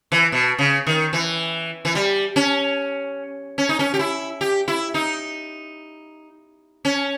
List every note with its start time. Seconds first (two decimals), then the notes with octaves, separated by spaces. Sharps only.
0.12 E3
0.32 B2
0.59 C#3
0.87 D#3
1.13 E3
1.85 E3
1.95 G3
2.36 C#4
3.58 C#4
3.69 D#4
3.79 C#4
3.94 G4
3.99 E4
4.41 G4
4.68 E4
4.94 D#4
6.85 C#4